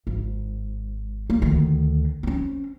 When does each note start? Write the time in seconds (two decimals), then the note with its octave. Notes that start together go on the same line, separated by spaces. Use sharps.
0.07 G#1
1.30 A#3
1.42 D2 D#3
2.23 C4 C#4